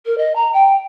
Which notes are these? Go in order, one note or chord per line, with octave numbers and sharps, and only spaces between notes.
A#4
D#5
A#5
G5